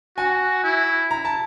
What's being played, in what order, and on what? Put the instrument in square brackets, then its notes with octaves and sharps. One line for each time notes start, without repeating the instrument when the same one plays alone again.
[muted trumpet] F#4 [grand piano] G#5
[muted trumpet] E4
[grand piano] A#5
A5